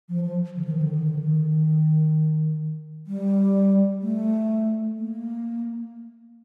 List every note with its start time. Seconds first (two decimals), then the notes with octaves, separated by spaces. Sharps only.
0.09 F3
0.24 F3
0.56 D3
0.65 F3
0.71 D#3
0.82 D3
0.95 D#3
1.07 D3
1.19 D#3
3.07 G3
4.01 A3
4.96 A#3